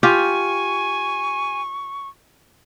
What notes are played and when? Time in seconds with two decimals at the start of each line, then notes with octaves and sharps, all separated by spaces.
0.03 F4 G4 G#5 C#6